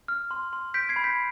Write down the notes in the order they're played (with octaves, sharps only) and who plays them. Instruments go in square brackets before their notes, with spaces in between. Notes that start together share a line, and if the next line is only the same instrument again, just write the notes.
[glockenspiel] F6
C6
C6
G6 B6 D7
G#6 C7
B5
G6 B6